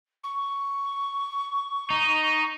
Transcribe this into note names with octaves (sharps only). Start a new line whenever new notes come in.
C#6
D#4